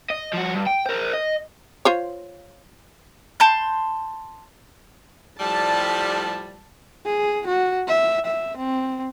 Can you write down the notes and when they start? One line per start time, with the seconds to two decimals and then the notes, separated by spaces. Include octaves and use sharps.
0.10 D#5
0.33 F3 F#4
0.54 G2
0.66 G5
0.86 A#4 C5
1.13 D#5
1.85 F4 C5 C#5
3.40 A5 C6 G6
5.40 A2 F3 G3 A5
7.06 G#4
7.47 F#4
7.88 E5
8.26 E5
8.57 C4